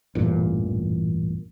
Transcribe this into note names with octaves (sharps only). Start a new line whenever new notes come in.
A1 E2 G2 A#2